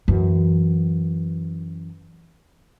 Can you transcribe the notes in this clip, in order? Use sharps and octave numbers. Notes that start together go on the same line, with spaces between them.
F#2 E3